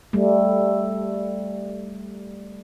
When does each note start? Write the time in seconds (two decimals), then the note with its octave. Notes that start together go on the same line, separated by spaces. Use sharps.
0.13 G3 A3